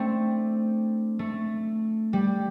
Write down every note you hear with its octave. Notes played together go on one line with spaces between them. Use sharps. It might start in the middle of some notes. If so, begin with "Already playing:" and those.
Already playing: A3 C4 D4
A3
G3